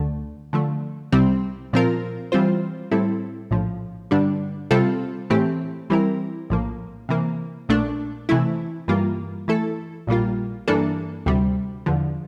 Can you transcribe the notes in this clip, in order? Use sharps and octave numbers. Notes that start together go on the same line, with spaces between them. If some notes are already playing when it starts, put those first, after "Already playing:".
Already playing: D2 D3 A3
D3 F3 A3
C2 C3 G3 C4
A#2 F3 C4 F4 A#4
E3 G3 C4 F4 C5
A2 G3 C4 E4 A4
A#1 A2 F3
G2 D3 G3 D4
C3 G3 C4 F4 A4
A2 E3 A3 C4 G4
E3 G3 C4 E4 A#4
A#1 A2 F3 A#3
C3 E3 A#3
A#1 A#2 A3 D4
C3 E3 A3 E4
G2 E3 G3 A#3 F4
E3 A3 E4 A4
A#1 A#2 G3 A#3 F4
G2 E3 A#3 D4 A4
D2 C3 G3
E2 D3 F3